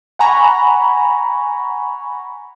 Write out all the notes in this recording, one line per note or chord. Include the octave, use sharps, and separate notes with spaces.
F#5 G#5 A#5 B5 C#6